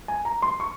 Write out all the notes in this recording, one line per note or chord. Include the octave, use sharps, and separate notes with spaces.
G#5
A#5
C6
C#6